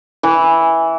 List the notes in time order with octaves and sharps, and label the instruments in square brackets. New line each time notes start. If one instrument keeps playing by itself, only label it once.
[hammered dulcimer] E3